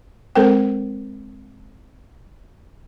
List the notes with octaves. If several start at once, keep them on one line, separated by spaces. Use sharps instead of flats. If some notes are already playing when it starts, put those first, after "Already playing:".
G#3 C4 A4 A#4 C5 G5